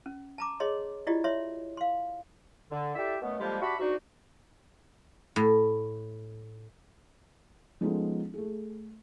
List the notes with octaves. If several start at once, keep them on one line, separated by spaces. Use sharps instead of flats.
C#4
A5 A#5 D6
G#4 C#5 D#5 C6
E4 F4 G4 D5 D#5
C#5 E5 C6
F5 C6
D3
E4 G4 A4 D5 E5
F#2 B2 A3 B3
D3 F3 G3 G#3 A#3 G4
D4 F#4 G4 E5 A5 B5
G#2 D4 D#4 F#4
A2
F3 G#3 B3 C#4 D#4 A4
A3 G#4